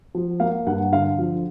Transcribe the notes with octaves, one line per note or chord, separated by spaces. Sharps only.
F3
A#3 F5
G2 F#5
D3 F5
F3